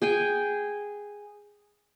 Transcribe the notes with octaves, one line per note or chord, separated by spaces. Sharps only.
G#4 G5 G#5